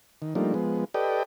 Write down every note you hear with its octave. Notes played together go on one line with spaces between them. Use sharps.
D#3
F3 G3 A3 A#3 D4 D#4
F3 G#3 B3
G4 A4 B4 D5 D#5 G5